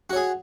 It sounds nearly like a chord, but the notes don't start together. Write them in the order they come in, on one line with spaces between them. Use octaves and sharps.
F#4 C#5 G#4